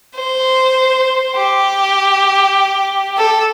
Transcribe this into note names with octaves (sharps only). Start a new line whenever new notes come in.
C5
G4
A4